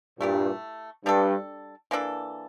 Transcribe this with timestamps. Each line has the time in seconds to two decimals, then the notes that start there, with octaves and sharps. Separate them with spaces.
0.19 G2 A#2 A3 E4 G4
1.05 G2 G3 D4 A4
1.91 E3 A#3 D4 A4